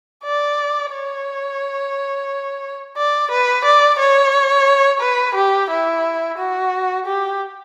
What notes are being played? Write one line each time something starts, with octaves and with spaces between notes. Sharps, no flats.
D5
C#5
D5
B4
D5
C#5
B4
G4
E4
F#4
G4